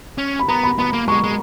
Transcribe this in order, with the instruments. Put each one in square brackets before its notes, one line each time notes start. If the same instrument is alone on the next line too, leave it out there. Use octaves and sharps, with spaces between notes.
[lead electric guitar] C#4
[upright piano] B5
[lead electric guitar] B3 [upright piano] A#5
[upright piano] B5
[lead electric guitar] B3 [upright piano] B5
[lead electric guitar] A#3
[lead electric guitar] G#3 [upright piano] C#6
[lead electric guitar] G#3